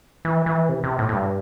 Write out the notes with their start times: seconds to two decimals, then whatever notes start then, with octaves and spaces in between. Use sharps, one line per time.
0.25 E3
0.46 E3
0.69 C3
0.84 C3
0.99 A2
1.09 A2
1.13 G2